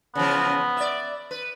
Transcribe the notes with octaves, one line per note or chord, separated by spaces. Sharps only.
C#3 E3 F3 B3
D5 E5
B4